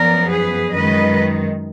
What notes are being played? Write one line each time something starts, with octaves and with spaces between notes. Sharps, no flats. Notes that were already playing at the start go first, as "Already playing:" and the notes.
Already playing: F#2 F3 B3 A#4 D5
G#4 B4
F#2 D#3 G#3 B4 D#5